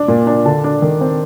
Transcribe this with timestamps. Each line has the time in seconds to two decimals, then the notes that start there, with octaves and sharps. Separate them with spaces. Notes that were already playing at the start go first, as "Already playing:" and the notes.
Already playing: D4
0.08 A#2
0.27 D4
0.45 D3 A5
0.64 D4
0.82 D#3
1.01 C4